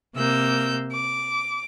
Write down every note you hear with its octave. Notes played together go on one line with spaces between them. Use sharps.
C3 A#3 E6 G6
D6